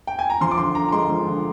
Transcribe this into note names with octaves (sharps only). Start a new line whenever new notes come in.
G5
G#5
A#5
F3 C6
D6
D3 C6
D3 A#5
A#5
G#3 C6
F3
D3